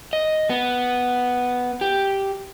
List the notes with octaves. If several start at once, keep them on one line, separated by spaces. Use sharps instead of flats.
D#5
B3
G4